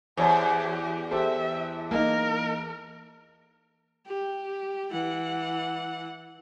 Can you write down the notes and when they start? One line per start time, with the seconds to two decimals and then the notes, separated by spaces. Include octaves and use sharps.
0.17 E2 G4 C5 C#5 A5
1.11 G4 A4 C5 E5
1.91 A#3 D#4 A#4
4.07 G4
4.91 E3 F#5